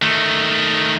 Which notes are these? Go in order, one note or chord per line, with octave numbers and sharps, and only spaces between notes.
D#3 A3